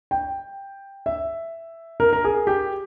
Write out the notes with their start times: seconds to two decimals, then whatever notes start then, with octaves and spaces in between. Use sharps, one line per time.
0.11 G5
1.06 E5
2.00 A#4
2.13 A#4
2.25 G#4
2.47 G4